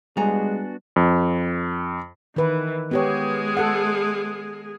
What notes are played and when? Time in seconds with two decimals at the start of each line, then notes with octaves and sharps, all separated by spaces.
0.17 G3 G#3 B3 D4 F#4 G#5 A#5
0.96 F2
2.36 D#3 E3 B4
2.91 G#3 B3 G4 G#4 C#5
3.57 A4 F#5